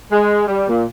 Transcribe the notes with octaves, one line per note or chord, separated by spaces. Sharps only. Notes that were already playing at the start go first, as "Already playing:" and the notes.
G#3
G3
A#2